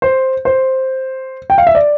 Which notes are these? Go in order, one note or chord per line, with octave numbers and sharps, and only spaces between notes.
C5
C5
G5
F5
E5
D5